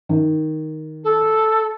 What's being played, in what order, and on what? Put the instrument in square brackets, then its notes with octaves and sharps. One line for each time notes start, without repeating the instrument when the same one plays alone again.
[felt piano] D#3
[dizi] A4